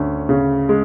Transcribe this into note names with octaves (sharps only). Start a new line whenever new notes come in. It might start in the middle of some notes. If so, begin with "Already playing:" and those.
Already playing: D2 C#4
C#3
G#3